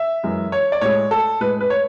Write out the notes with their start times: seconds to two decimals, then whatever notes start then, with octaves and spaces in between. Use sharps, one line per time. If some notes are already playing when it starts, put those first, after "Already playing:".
Already playing: E5
0.23 F#2 E3 G#3
0.52 C#5
0.72 D5
0.81 A2 G#3 C#5
1.11 A4
1.41 A2 G#3 B4
1.61 B4
1.70 C#5